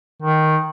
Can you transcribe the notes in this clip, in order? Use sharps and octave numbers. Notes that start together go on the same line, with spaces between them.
D#3